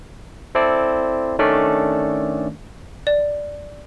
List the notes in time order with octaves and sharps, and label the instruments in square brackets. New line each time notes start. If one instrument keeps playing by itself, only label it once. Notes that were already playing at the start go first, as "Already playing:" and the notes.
[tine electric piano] C4 E4 A4 C5 D5
D#3 A3 C#4 D4 A4 D5
[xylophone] D5